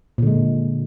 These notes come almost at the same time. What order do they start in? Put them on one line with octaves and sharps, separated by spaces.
A#2 D3 G#3